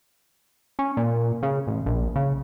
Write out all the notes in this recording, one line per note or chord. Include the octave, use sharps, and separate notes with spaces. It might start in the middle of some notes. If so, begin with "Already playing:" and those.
C#4
A#2
C#3
A1
A#1
C#3